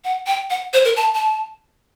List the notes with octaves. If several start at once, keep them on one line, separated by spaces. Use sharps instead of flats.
F#5
G5
F#5
C5
A#4
A5
A5